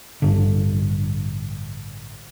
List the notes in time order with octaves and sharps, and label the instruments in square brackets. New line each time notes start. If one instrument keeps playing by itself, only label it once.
[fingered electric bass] A1 G2 D3